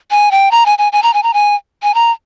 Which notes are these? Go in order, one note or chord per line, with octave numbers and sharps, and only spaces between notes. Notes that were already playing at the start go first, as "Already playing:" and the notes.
G#5
G5
A#5
G#5
G#5
G#5
A#5
G#5
A#5
G#5
G#5
A#5